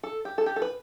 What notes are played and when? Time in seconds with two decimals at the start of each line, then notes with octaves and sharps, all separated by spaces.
0.03 A4
0.25 G4
0.38 A4
0.46 G4
0.56 A4
0.62 B4